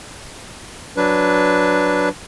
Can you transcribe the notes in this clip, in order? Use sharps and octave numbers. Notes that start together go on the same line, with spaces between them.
F#3 D4 B4